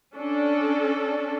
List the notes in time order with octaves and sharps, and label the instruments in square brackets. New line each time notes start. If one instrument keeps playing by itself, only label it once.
[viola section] C#4 D4 A4